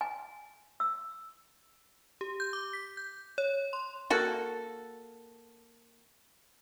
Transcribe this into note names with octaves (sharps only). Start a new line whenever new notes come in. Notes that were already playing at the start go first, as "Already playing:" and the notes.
G#5
E6
G4
G6
D6
B6
G6
C#5
C6
A#3 F#4 A4